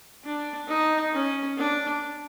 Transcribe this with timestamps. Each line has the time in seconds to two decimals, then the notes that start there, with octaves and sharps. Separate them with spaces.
0.24 D4
0.68 D#4
1.13 C#4
1.58 D4